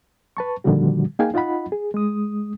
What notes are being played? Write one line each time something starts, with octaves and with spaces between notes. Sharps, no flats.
B4 A5 C#6
A#2 D3 D#3 F3 G3 F#4
A#3 D#4 G#4 F5 G5 G#5
D#4 F4 D#5 F#5 B5
G#4
G#3 D#6